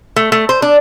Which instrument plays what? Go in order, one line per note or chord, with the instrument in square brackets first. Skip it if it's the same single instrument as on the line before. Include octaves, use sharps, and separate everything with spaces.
[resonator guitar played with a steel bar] A3
A3
C5
D4